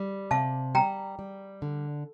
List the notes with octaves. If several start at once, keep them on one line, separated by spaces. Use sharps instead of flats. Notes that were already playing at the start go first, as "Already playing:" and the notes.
Already playing: G3
C3 F5 A5
G3 G5 A#5
G3
D3